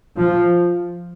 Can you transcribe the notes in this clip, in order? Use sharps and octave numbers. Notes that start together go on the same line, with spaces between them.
F3